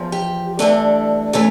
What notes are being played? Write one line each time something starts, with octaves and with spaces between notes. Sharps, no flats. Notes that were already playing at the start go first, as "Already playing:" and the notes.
Already playing: E2 F3
G4
G2 E3 A3 D4 A4
A2 E3 A3 C#4 A4